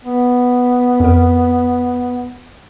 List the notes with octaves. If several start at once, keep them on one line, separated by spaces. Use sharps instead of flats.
B3
F2 A#4